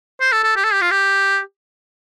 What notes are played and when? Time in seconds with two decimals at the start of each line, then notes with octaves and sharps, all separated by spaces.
0.21 C5
0.32 A4
0.44 A4
0.56 G4
0.64 A4
0.73 G4
0.81 F4
0.91 G4